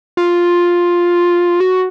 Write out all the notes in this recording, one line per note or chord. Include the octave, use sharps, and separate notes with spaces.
F4
F#4